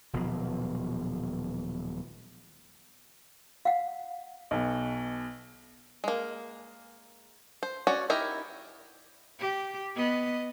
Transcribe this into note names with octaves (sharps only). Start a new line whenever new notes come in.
D#1 B2 F3 F#3
F5 F#5
B1 B2
G#3 A#3
C5
C#4 F#4 C#5 D5
D#4 E4 G4 A#4
G4
B3 D#5